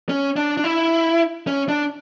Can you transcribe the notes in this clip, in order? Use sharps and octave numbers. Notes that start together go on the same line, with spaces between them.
C#4
D4
D4
E4
C#4
D4